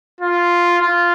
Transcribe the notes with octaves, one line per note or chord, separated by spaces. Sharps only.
F4
F4